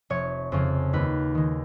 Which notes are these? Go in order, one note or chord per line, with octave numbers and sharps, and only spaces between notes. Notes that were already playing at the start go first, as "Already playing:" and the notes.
F1 C#5
F2 C#3
D#2 B4
D#3 G#3